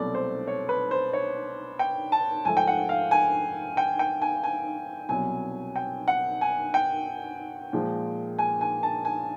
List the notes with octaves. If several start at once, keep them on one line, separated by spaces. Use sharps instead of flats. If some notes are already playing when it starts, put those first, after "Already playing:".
Already playing: C2 B2 F#3 A3 D5
C5
C#5
B4
C5
C#5
G5
A5
G#2 F3 A3 G#5
G5
F#5
F5
G#5
G5
G5
G#5
G#5
C2 B2 F#3 G#5
G5
F#5
G#5
G5
A#2 F3 G#3
G#5
G#5
A5
G#5